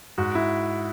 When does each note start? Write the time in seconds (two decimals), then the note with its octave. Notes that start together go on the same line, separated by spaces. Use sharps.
0.18 G#2 F#4
0.35 E4